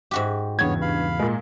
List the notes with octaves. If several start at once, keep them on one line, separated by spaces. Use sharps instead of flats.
G#2 F#4 G4
E2 G2 C#3 E3 B3 C#5 G#6
F5 B5
A#2 G#3